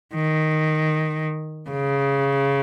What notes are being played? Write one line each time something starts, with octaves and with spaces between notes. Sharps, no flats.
D#3
C#3